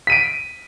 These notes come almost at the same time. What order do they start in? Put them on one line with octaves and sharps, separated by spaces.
B6 D#7 D7